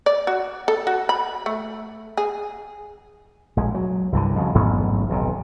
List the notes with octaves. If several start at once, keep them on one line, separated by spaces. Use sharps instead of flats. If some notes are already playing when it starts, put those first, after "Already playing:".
D5
F#4
A4
F#4
B5
A3
G#4
A#1 G#3
F#3
C2 G2 D3
F2 C#3 F#3
A1 G#2 F#3 B3
D#1 B1 C3